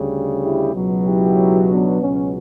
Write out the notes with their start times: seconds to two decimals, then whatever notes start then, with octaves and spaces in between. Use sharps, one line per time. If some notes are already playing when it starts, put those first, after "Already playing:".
Already playing: D2 C#3 G3
0.43 E4 G4
0.74 C#2 B2 F#3
1.06 E4 G4
1.69 B3 D4
2.01 C#2 B2 F#3 C#4